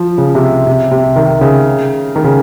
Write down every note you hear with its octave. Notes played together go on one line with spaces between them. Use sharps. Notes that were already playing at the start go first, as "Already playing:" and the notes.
Already playing: F3
C#3
C3
C3
C3
D#3
C#3
D#3
C#3